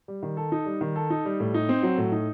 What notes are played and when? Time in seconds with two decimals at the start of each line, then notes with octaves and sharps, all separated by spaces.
0.08 G3
0.23 D#3
0.37 A4
0.52 D#4
0.66 G3
0.81 D#3
0.96 A4
1.10 D#4
1.25 G3
1.40 A2
1.54 D#4
1.69 C4
1.83 F#3
1.98 A2
2.12 D#4